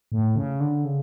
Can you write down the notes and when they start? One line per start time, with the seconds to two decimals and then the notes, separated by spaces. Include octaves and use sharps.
0.12 A2
0.36 C#3
0.60 D3
0.85 C#3